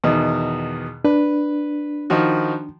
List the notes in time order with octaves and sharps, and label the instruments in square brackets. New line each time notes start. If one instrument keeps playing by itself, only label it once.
[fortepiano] E2 B2 D#3
[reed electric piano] D4 [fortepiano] B4
[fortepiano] D#3 F3 F#4